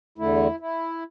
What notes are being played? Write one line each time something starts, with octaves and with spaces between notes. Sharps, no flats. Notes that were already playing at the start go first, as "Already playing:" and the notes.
E2 D3 A3 E4
E4